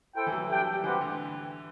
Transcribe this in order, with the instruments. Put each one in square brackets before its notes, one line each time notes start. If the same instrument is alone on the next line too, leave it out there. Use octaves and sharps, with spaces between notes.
[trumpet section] E4 A4 C5 G5
[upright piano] E3
F#3
[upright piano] G3 [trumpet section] D4 A4 E5 G5
[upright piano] F#3
G3
[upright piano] E3 [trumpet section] G3 C4 G4 B4 F#5
[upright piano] D3